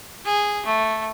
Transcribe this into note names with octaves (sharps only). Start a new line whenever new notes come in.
G#4
A3